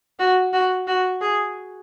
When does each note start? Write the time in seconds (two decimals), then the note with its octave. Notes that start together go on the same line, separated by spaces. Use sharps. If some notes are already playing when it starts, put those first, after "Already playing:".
0.19 F#4
0.53 F#4
0.87 F#4
1.21 G#4